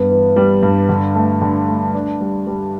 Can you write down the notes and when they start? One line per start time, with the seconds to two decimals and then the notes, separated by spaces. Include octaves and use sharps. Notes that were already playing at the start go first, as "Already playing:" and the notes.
Already playing: G2 B3
0.10 E3
0.36 G3
0.63 G2
0.89 D3
1.15 A3
1.42 D3
1.68 A3
1.94 D4
2.21 G3
2.47 G3